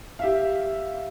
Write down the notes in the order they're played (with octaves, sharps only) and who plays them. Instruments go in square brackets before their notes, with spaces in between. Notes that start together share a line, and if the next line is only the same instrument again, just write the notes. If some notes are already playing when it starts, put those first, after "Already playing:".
[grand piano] G4 E5 F5